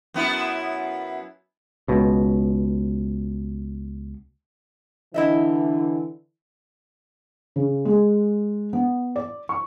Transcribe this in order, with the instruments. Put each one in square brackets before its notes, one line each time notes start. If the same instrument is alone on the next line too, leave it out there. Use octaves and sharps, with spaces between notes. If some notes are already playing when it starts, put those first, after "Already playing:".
[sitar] F#2 B3 E4
[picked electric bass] C#2 B2
[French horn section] D3 E3 [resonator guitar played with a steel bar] E4 D#5 E5
[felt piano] C#3
G#3
B3
D5
C#6